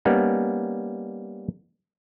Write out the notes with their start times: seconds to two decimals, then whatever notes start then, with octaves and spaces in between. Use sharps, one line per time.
0.05 G3 A#3 B3 C#4 D#4